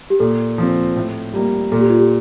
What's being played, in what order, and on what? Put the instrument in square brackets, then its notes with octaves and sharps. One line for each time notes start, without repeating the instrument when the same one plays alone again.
[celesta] G4
[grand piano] A#2 [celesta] A4
[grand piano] F3 C4
A2
G3 A#3
[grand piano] A#2 [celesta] A4
[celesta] G4
F4
G4